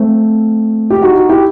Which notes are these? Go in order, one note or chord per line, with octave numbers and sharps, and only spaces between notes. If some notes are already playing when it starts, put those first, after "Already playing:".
Already playing: A3 C4
G4
D#4 F#4
D#4 F#4
E4 G4